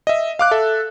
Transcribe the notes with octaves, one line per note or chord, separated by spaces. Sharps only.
D#5 E5
F5 D6 F#6
A4 E5